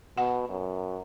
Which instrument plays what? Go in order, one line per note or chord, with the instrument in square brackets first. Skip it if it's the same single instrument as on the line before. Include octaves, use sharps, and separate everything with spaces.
[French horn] B2 [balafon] F#5
[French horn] F#2